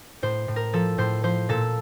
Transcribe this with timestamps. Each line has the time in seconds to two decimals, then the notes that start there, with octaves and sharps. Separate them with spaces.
0.22 A2 C5
0.48 A2
0.56 A#4
0.73 F3 A4
0.98 A2 C5
1.24 F3 C5
1.49 A#2 A4